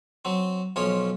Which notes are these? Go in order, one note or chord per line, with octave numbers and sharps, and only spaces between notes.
F#3 C4
B1 F3 C#4 C#5